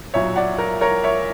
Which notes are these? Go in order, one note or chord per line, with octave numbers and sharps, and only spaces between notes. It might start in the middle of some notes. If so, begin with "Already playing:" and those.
B1 A#2 F#3 C#5 E5
D5 F#5
A#4
A#4 C#5
C#5 E5